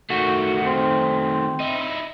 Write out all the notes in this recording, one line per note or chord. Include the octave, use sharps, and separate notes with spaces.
D#3 A3 F#4
C4
D#4 E4